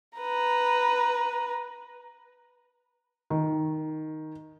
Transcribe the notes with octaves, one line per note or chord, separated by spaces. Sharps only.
B4 A#5
D#3